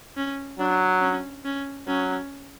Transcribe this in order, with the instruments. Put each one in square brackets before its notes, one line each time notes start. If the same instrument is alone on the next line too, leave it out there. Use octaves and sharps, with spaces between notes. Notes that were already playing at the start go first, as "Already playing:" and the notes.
[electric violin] C#4
[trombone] F#3 [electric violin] D4
[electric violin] C#4
C#4
[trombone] F#3 [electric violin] C#4